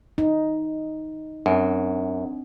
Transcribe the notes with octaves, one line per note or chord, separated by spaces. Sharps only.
D#4
F#2 C4 D4